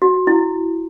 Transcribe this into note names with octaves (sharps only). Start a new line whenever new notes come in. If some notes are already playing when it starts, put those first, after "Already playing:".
F#4
E4